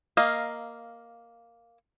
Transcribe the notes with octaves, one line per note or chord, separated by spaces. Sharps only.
A#3 D#5 F5